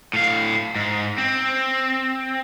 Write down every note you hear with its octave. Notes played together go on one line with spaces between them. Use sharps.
A2 F5
G#2
C4